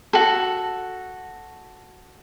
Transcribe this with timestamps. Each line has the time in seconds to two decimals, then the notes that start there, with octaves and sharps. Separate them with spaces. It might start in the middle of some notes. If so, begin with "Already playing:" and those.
0.13 F#4 A4